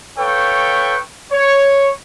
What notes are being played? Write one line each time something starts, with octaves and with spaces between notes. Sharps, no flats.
A4 B4 C#5 F5 G5 C#6
C#5